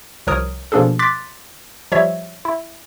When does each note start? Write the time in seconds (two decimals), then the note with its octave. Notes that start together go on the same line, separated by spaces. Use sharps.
0.27 C2 F3 A#4 C#5 D#6
0.72 B2 F3 A#3 D4 G#4 A4
0.99 C6 D6 F#6 A6 B6
1.92 F3 G3 C#5 E5
2.45 E4